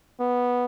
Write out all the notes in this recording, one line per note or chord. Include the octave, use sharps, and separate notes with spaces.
B3